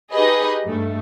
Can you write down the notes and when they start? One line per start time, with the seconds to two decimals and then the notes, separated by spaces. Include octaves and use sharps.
0.12 D#4 G4 G#4 B4 D#5
0.64 G2 A3